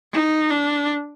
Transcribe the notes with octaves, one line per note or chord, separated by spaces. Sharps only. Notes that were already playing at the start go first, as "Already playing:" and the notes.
D#4
D4